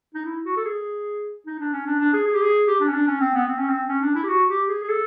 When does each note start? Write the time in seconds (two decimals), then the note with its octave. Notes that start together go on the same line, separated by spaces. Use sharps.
0.14 D#4
0.25 E4
0.45 F#4
0.57 A4
0.65 G#4
1.47 D#4
1.60 D4
1.73 C#4
1.86 D4
2.00 D4
2.13 G#4
2.27 G#4
2.34 G4
2.42 G#4
2.67 G4
2.80 D4
2.89 C#4
2.94 D4
3.07 C#4
3.21 C4
3.34 B3
3.48 C4
3.59 C#4
3.69 C4
3.88 C#4
4.02 D4
4.15 E4
4.23 G4
4.29 F#4
4.49 G4
4.69 G#4
4.83 G#4
4.90 A4